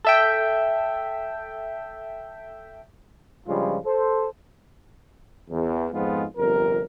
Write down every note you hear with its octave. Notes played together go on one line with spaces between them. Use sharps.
A4 E5 G5
G2 C#3 F3 G3 G#3 F4
A4 C5
E2
F2 G#2 G#3 B3 C4 F4
G1 F2 C3 A#4